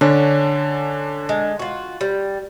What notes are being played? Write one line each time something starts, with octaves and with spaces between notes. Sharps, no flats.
D3 C#4 D4
G#3
F4 F#4
G3